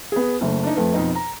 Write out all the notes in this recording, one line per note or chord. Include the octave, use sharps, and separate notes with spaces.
B3 G#4
F#1 A3
D4 D#4
F2 A3 B4
F2 B2 D#4
A#5